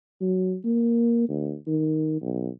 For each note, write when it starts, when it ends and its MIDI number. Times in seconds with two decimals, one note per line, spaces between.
0.21 0.56 54
0.64 1.26 58
1.29 1.55 38
1.67 2.20 51
2.22 2.49 35